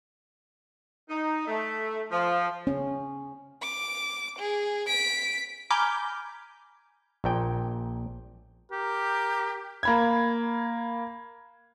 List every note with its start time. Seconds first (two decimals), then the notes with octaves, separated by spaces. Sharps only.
1.10 D#4
1.47 A3
2.12 F3
2.67 C#4
3.62 D6
4.39 G#4
4.87 B6 D7
5.70 G#5 A#5 B5 D6 F6 G6
7.24 A#1 A#2 G5
8.71 G4 A#4
9.83 A#3 B5 G#6